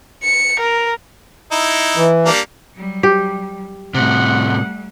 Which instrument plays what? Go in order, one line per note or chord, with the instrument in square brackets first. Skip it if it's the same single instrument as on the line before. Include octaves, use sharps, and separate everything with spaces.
[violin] C#7
A#4
[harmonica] D#4 E4
[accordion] E3
[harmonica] G3 A#3 D4
[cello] F#3 G3
[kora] G4
[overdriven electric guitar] A2 C3 [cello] G3 A3 [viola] F#5